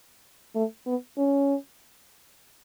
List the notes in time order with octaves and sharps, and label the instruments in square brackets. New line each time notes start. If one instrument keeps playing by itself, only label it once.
[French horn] A3
B3
C#4